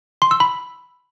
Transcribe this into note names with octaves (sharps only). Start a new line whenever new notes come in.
C6
E6
B5